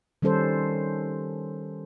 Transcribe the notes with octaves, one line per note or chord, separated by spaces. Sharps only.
D#3 G3 C#4 A4 C5